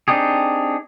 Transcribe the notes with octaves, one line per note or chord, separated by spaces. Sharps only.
C4 D4 D#4 G4 G#4